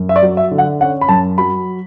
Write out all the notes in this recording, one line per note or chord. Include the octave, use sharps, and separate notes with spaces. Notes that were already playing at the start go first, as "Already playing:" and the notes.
Already playing: F#2
E5
D5
F#3
E5
D3
F#5
C#4 F#5
B5
F#2 A5
F#3 B5